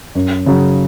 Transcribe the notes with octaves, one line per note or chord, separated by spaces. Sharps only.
F#2
C#3 F#3